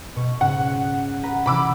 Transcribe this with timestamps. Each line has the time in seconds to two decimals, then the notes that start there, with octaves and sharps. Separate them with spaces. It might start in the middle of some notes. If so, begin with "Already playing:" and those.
0.16 B2 C#6
0.41 G#2 C#3 F#5
1.23 B4 F#5 A#5
1.46 C3 E3 B5 D6 E6